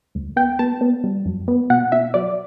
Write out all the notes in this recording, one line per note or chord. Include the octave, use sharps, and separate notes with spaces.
D2
B3 G5
B3 A5
B3
G3
F#2
B3
B2 F#5
B2 E5
F#3 D5